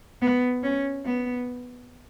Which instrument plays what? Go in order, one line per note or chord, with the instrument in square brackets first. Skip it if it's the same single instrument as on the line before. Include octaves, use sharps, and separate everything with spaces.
[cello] B3
C#4
B3